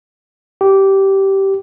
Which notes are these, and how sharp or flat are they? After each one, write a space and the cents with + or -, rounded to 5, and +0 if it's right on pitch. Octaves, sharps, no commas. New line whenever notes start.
G4 -15